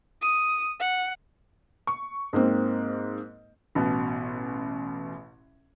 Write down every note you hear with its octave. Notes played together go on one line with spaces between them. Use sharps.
D#6
F#5
C#6
G#2 A#3 C4
A1 B2